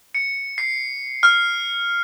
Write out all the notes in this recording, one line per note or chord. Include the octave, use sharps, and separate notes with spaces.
C#7
C7
F6